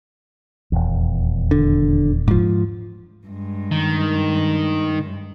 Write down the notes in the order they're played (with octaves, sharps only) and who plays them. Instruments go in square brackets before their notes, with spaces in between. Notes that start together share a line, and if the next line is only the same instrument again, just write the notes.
[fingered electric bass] D#1 G#1 E2
[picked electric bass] D3
G#2 F3
[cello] G2 G#3
[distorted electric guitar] D#3